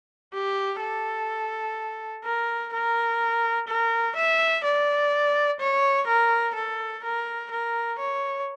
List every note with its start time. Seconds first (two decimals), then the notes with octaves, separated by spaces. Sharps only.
0.34 G4
0.81 A4
2.24 A#4
2.73 A#4
3.68 A#4
4.16 E5
4.64 D5
5.60 C#5
6.07 A#4
6.55 A4
7.04 A#4
7.51 A#4
7.99 C#5